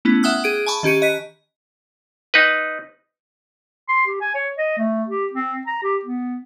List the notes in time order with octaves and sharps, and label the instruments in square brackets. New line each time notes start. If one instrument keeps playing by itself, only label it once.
[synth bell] A3 B3 C#4 E4
E5 F#5 G5 D#6 F6 F#6
G#4 D7
G#5 A5 B5 C#6
D#3 C#4 G4 C#7 D#7
D#5 F#6 B6
[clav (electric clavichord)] D#4 B4
[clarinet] C6
G4
G#5
C#5
D#5
A3
G4
C4
A#5
G4
B3